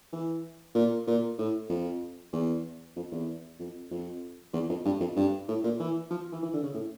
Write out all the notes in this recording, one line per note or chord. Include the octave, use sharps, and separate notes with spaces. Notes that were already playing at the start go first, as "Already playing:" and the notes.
E3
A#2
A#2
A2
F2
E2
F2
E2
F2
F2
E2
F2
G2
F2
G2
A2
A#2
E3
F3
E3
E3
D3
C#3
A2